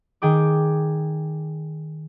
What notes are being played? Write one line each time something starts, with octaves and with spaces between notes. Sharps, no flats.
D#3 G#4 G5 D6